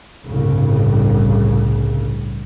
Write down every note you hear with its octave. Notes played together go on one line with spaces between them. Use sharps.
G1 C2 A2 C#3